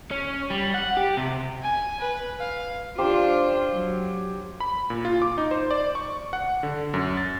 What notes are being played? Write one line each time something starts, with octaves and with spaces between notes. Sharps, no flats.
C#4
G3
F#5
G4
C3
G#5
B4
F5
D4 F4 G4 C5
F#3
B5
A#2
F4
D6
D#4
C5
D5
C#6
F#5
D3
F#2
A6